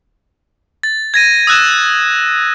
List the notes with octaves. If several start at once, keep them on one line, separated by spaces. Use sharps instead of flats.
A6
G#6 A#6 D#7
D#6 E6 F#6 G#6 E7